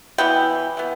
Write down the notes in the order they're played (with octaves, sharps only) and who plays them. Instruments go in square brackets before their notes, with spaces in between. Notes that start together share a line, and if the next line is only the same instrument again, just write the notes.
[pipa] E3 B3 E4 G5
E3 B3